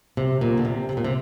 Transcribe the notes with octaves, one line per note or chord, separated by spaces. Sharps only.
C3
A#2
D3
C3
C3
A#2
C3